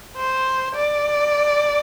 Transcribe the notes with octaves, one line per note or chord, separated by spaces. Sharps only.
C5
D5